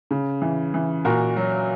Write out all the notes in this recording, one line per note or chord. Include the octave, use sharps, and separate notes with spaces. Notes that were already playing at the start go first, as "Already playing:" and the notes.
C#3
E3
E3
A#2 F#4 A#4
F#3